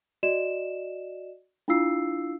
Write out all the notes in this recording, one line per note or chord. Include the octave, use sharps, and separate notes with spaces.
F#4 D5 D#5 E7
D4 E4 F4 F5 E6 C7